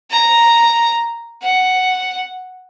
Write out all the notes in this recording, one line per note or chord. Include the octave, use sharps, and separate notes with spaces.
A#5
F#5